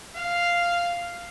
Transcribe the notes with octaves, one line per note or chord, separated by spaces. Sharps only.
F5